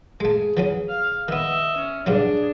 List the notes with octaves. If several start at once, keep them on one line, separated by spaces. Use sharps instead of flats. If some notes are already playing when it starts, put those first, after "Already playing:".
G#3 A3 G#4
E3 F#3 C#4
F5
D#3 B3 D#5 E5
C#4
G2 C#3 F#3 D4 G#4